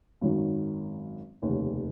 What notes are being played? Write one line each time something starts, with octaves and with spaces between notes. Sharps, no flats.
G#1 F#2 D#3 F#3
F1 D#2 C#3